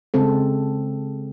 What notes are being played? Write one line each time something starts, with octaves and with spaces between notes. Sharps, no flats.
C#3 G#3 C4 A4